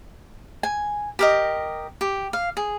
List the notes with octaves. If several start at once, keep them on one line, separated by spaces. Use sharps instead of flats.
G#5
G4 A#4 D#5
G4
F5
G#4